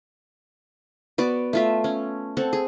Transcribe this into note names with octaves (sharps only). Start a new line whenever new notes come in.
B3 F#4 D5
A3 F4 E5
C#4
C4 A4 F#5
G#4